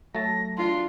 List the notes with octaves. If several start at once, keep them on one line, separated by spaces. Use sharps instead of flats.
F#3 A3 A5 A#6
D4 F4 C6